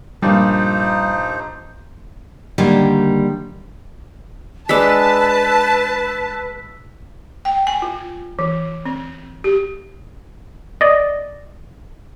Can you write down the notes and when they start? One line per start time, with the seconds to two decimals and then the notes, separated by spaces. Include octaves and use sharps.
0.22 G2 A#2 F3 G3 D#4 C5
2.58 D3 D#3 G3 A#3
4.69 G#3 D4 B4 A5 E6 B6
7.45 G5
7.67 G#5
7.82 F4
8.39 E3
8.86 C4
9.44 G4
10.81 D5 D#5